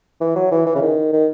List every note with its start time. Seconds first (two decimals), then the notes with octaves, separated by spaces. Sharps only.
0.21 E3
0.36 F#3
0.51 E3
0.66 E3
0.75 C#3
0.82 D#3
1.13 D#3